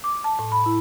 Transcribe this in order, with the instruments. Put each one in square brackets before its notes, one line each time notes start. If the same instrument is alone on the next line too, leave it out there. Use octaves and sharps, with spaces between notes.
[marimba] D6
A5
A2
B5
E4